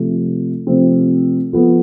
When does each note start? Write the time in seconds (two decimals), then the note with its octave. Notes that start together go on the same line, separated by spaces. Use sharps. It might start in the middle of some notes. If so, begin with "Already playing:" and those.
Already playing: C3 F3 A3
0.67 C3 F3 A3 C4
1.53 F3 B3 F4 A4